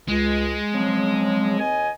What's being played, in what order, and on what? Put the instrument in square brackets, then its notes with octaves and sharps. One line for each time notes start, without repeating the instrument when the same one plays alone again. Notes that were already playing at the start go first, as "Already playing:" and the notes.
[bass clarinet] C#2 [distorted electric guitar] G#3
[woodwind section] C#3 F3 F#3 [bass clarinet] C4
[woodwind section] D#2 D#5 G#5